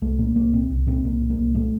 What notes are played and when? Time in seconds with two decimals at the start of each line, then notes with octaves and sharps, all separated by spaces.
0.02 C2 A3
0.18 A#2 A#3
0.36 C2 A#3
0.53 A#2 C4
0.70 C2
0.87 A#2 C4
1.04 C2 A#3
1.21 A#2
1.30 A#3
1.38 C2
1.55 A#2 A3